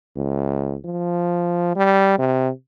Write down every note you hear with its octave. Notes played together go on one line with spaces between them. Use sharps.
C#2
F3
G3
C3